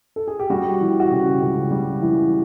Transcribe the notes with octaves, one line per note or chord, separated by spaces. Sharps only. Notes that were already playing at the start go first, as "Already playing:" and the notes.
A4
G#4
G4
G3 F#4
E3
F#4
C#3 G4
C#2
G3
E3